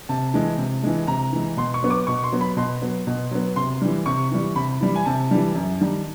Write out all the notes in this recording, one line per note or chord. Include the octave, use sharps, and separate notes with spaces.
C3 A5
E3 G#3
C3
E3 G#3
C3 A#5
E3 G#3
B2 C6
C#6
F#3 B3
D6
B2 C#6
C6
F#3 B3
B5
B2 C6
F#3 B3
B2
F#3 B3
C3 C6
E3 G3
C3 C#6
E3 G3
C3 B5
E3 G3
G#5
C3 A5
E3 G3
F#2
D#3 G3